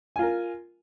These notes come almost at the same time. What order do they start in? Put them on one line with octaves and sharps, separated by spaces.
G#5 F4 A#4